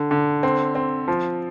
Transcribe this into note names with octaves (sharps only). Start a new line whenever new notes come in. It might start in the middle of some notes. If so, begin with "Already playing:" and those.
Already playing: D3
D3
C4
C4
F3